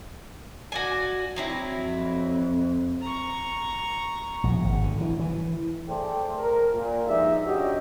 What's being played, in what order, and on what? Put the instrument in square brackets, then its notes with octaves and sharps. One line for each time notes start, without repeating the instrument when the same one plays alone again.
[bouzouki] F#4 D5 G#5
F#3 C4 E4
[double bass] F2
[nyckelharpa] A#5 C#6
[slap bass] A#1
G#1
D3
E3
E3
[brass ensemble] A3 G#4 A4 C5 D5 G5
A#4
A#2
G2 F3 G#3 D#4 D5 E5
C#4 D4 F#4 G4 D#5